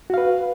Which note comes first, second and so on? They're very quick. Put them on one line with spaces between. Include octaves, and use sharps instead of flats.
F#4 F5 B4